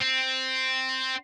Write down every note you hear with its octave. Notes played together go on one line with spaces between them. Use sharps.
C4